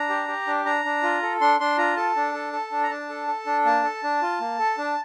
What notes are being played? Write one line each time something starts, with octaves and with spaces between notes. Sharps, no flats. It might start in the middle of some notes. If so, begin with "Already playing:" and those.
Already playing: D4 A#5
G4
G4
D4
D4 A#5
D4
F4
A4
D4 C6
D4 C6
F4 A#5
A4 A5
D4
A4
A4
D4
A#5
D4 A5
A4
A4
D4
A#3 A5
A4
D4
F4
A#3
A4
D4